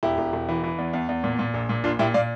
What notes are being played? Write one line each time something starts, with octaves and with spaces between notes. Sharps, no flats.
E1 E4 G4
E1
E1
E3
E3
E2
E2
E2
A#2
A#2
A#1
A#2
A#1 D4 F4
A#2 E4 G4
A#2 D5 F5